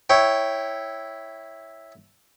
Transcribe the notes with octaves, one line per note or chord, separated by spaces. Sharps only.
E4 C#5 G5